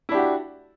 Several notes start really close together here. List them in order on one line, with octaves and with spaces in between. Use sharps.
E4 D4 G4 F#4